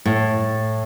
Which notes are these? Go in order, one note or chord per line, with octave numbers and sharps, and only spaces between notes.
A2